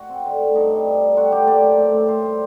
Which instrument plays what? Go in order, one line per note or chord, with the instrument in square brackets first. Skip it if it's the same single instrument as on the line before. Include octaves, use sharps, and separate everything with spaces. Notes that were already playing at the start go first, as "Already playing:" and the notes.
Already playing: [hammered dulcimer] F#4
C4
D3
A3
G2 D#4
G3
G2
D3
C4 F#4
A3 G4
A#2 D5
F#3
A2
C4
A2 C5
G3